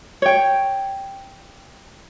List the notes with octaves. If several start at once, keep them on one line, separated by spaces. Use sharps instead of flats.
C#5 G5